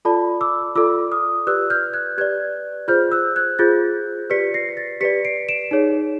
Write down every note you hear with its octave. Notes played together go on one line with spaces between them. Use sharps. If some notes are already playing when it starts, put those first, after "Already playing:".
F4 A4 D5 A5 B5
D6 E6
F4 A4 D5 D6 E6
D#6 F6
G4 B4 D5 E6 F#6
F6 G6
F#6 G#6
G4 B4 D5 F#6 G#6
F4 G#4 C5 F6 G6
E6 F#6
F#6 G#6
F4 G#4 C5 G6 A6
G4 B4 D5 B6 C#7
A#6 C7
A#6
A6 B6
G4 B4 D5 B6 C#7
C7 D7
D7 E7
D#4 G#4 C#5